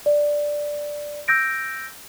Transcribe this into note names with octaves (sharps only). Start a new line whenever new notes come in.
D5
E6 G6 A#6 D7